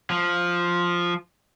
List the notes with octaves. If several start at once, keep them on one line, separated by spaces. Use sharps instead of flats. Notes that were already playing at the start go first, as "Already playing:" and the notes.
F3